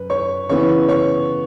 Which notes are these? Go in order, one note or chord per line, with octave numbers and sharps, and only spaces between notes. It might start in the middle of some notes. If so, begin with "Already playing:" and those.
Already playing: F#2 B4
C#5 C#6
C#3 E3 B3 E4 C#5 C#6
C#5 C#6